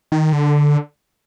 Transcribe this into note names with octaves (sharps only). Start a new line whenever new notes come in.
D#3
D3